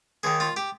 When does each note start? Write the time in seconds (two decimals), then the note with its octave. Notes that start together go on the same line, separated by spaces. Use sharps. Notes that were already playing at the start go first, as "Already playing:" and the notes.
0.23 D#2 D#3 G#4
0.40 F4
0.57 G4